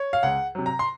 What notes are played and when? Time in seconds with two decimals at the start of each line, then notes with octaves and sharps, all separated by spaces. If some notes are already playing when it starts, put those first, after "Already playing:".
Already playing: C#5
0.13 F5
0.23 C#2 F#5
0.55 C3 F#3
0.66 A#5
0.79 C6